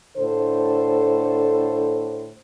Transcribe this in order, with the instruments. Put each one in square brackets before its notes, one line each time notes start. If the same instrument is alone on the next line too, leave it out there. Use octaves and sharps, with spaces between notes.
[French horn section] A2 D3 A4 C5